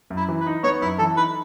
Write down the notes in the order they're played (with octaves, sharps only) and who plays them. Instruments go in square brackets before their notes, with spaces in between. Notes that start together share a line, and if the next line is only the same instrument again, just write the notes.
[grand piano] F#2
[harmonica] E4
[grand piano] E3
[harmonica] B4
[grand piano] D#4
[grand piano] B3 [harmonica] C#5
[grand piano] F#2 [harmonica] E4
[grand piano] E3 [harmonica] A4
[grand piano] D#4 [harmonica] B4